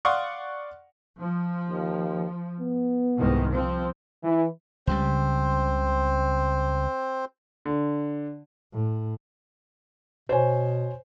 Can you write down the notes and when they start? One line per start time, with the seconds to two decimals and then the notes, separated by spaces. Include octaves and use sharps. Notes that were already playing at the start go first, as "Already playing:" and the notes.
0.05 D5 F5 F#5 C6 C#6 D#6
1.18 F3
1.68 D#2
2.60 B3
3.17 C2 G#2 D#3
3.52 F3 C4
4.24 E3
4.87 C#2 C#3 G3 C4 C5
7.65 D3
8.73 A2
10.29 B2 C5 C#5 G#5